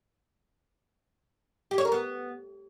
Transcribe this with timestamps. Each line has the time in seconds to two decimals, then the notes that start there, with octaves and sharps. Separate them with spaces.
1.71 G4
1.78 C#5
1.85 A#4
1.92 B3